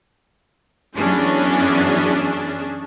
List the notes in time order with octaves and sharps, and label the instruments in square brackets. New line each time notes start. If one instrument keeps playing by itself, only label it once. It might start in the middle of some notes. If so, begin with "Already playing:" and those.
[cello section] F#2 E3 B3 [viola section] C#4 D4 G#4